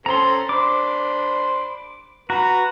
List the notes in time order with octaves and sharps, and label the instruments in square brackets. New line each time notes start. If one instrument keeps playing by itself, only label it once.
[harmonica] C4 C#4 A4 [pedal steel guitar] A#5 C6
[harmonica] D4 C5 B5 [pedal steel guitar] D6
[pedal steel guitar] F#4 [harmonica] B4 [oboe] A#5